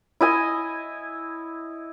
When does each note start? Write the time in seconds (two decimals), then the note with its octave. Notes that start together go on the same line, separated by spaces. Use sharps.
0.21 E4 D#5 G#5